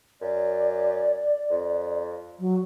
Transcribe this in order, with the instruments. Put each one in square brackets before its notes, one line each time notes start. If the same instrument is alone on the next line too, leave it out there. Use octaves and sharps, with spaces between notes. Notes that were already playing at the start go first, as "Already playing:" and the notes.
[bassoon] F#2 [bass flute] D5
[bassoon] F2
[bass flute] F#3